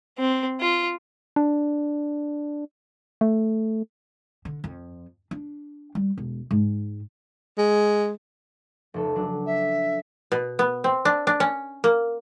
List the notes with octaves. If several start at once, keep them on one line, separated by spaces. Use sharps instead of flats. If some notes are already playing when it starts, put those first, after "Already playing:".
C4
F4
D4
A3
D3
F2
D4
G3
E1
G#2
G#3
F1 C#2 A4
F#3 D4
E5
B2
B3
C4
D4
D4
C#4
A#3